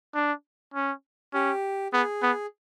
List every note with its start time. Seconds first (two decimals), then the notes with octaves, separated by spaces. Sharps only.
0.15 D4
0.74 C#4
1.33 C#4 G4
1.93 B3 G#4
2.22 B3